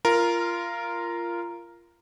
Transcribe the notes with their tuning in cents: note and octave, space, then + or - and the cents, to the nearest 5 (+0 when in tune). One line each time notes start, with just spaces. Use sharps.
F4 -20 A#4 +0